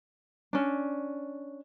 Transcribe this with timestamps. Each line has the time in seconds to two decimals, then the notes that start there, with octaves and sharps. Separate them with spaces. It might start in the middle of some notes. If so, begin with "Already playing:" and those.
0.53 C#4 D4